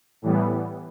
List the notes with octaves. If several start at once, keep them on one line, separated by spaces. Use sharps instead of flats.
A2 E3 G3 B3